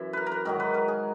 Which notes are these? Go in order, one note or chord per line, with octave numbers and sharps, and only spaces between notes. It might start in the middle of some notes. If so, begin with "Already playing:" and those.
Already playing: F#2 E3 E4
A#4 B4
A#4
B4
G#2 D#3 F#3 A#4
B4
A#4
G#4